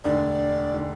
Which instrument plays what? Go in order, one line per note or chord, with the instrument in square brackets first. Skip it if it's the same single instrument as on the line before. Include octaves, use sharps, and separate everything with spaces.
[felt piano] E1 D2 D3 [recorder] D5
[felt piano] D3